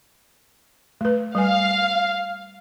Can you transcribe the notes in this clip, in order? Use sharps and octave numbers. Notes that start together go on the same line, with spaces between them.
A3 B4
G3 B4 F5 G#5